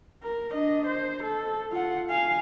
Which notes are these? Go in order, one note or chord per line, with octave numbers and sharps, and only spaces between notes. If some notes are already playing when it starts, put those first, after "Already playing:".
A#4
D4 D#5
C5
A4
F4 F#5
F5 G#5